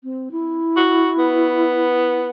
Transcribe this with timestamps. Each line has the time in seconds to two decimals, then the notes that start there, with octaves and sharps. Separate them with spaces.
0.04 C4
0.32 E4
0.77 F#4
1.19 B3